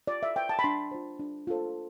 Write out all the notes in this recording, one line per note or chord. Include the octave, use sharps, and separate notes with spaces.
F4 D5
E5
B4 G5
A5
B5
D4 C6
F4 C5
D4
F4 A4 C5